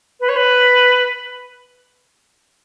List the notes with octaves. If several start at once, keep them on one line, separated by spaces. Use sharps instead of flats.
B4
C#5
B4